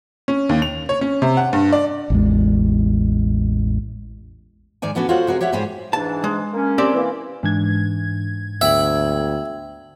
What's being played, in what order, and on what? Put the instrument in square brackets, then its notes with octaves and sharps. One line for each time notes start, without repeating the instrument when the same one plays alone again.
[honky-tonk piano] C#4
D#2
F7
C#5
C#4
C3
F#5
G2
D5
[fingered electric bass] A1 E2 G#3
[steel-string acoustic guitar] G#2 D#3 D5 G#5
A2 B3 C#4 D4 F#4
F4 F#4 A4 C5 C#5 F#5
C3 F#4 G#4 A#4
G4 C#5 D5 E5 F#5
G#2 G3 G4 G#4 C5
[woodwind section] G#2 E3 D4 [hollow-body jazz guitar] A5
[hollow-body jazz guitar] G#3
[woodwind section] A#3 C#4
[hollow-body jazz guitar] C4 G4 D5
[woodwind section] E3 A#3
[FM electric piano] G#2 G#6 [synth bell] E3 D4
[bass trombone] D2 [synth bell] B3 G5 F#7 [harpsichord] E5